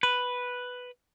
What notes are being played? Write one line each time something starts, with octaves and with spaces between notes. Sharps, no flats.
B4